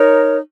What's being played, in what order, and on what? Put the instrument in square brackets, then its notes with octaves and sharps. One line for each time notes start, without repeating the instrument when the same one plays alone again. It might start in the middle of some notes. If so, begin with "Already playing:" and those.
Already playing: [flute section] D#4 A#4 C#5